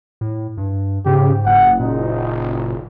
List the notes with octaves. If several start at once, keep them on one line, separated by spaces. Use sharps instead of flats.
A2
G2
G#2 C#3 G4
F#1 F#5
A#2 D#4